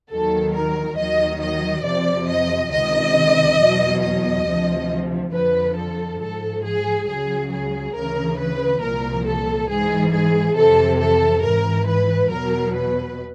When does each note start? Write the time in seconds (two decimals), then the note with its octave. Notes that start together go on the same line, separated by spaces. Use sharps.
0.10 D#2 D#3 F#3 A4
0.54 A#4
0.98 D#2 D#3 F#3 D#5
1.41 D#5
1.85 F2 C3 F3 D5
2.28 D#5
2.72 C#2 C3 D#3 D#5
3.59 E2 B2 F#3
4.02 D#5
4.46 D2 C3 F3
5.33 F2 D3 F3 B4
5.77 A4
6.20 G#2 F3 A4
6.64 G#4
7.08 C#2 C#3 F#3 G#4
7.52 G#4
7.95 D2 C#3 E3 A#4
8.38 B4
8.82 C2 A#2 F3 A#4
9.25 A4
9.69 G#2 E3 G#4
10.13 G#4
10.56 F2 C3 E3 A4
11.00 A4
11.43 G#2 E3 A#4
11.87 B4
12.31 E2 B2 F#3 A#4
12.74 B4